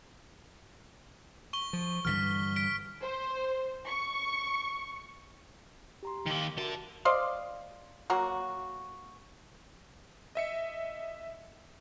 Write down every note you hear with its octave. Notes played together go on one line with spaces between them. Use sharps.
C#6 G7
F3
G2 D3 E3 F6 B6
B6 D7
C5
C#6
G4 A#5 C6
D#3 A#3
D3 F#4 A#4 E5 A5
C5 D5 D#5 F5
F#3 A#3 F#4
D#5 E5 C#7